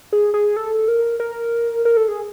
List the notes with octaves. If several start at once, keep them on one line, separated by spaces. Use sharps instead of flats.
G#4
G#4
A4
A#4
A#4
A#4
A4
G#4